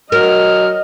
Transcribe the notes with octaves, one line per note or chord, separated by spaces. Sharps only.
F#3 A#4 D#5 F6